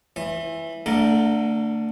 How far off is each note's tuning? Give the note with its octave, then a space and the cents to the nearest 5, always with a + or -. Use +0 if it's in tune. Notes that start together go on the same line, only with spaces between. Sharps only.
E3 +0 C5 +45
D3 +0 A3 +35 A#4 +0